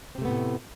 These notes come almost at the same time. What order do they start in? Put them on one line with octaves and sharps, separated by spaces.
C4 C3 A3 B3 A2